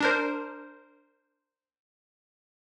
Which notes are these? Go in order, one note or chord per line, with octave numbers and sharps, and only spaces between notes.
D4 A#4 C5